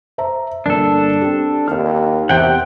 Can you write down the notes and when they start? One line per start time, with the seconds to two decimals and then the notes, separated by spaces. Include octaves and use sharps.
0.18 C5 E5 A#5
0.66 G1 A#3 D4 A4
1.22 C4 G4
1.68 D#2 F6
2.29 E2 C3 F#5 G5